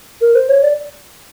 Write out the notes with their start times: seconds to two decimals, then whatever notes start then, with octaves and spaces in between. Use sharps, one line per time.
0.21 A#4
0.35 C5
0.49 C#5
0.63 D5